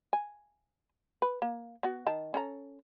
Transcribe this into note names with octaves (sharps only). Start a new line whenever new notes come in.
G#5
B4
A#3
B3 F#4
D#3 A5
C#4 A4 A#5